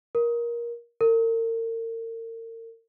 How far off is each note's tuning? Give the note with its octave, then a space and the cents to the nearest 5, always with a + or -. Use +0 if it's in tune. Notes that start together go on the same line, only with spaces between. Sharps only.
A#4 +20
A#4 -40